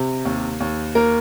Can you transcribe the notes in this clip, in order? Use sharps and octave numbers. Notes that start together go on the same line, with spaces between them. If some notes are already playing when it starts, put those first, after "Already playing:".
Already playing: C3
D#2
D#2
A#3 A#4